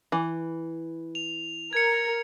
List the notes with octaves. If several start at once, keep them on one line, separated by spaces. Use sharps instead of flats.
E3
F7
A#4 G#6 C#7